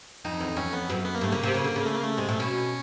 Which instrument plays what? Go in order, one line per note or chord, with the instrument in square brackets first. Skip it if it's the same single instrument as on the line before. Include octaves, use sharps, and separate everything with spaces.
[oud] F2 [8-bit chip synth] D#4
[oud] E2
[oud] F2 [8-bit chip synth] C#4
[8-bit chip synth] B3
[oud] F#2
[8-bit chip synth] B3
A#3
[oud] G2 [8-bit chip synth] A3
[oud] C#3 [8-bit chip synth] A#3
[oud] C3
C#3
D3
C#3
[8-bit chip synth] A3
A#3
A3
[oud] C3 [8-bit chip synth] G#3
[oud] A#2 [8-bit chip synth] A3
[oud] B2 [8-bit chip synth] C#4